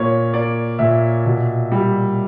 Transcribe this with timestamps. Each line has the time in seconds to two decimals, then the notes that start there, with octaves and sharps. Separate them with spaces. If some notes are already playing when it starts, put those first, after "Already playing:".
Already playing: A#2 A#3 C#5
0.33 A#3 D5
0.79 A#2 E5
1.26 B2
1.72 G3